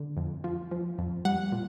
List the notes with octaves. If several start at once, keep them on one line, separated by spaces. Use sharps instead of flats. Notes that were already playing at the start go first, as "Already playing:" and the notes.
Already playing: D3
F2
F3
F3
F2
G3 F#5
A#2